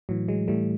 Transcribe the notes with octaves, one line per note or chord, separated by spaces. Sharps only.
A2 E3 F#3
F#3 G#3
A2 E3 G3 A3